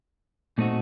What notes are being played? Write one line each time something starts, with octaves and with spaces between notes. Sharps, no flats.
A#2 A3 C4 D#4 F#4